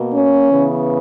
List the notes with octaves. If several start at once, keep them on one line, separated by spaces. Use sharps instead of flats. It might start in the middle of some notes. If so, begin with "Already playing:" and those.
Already playing: B2 A#3
C#4
C#3 E3 B3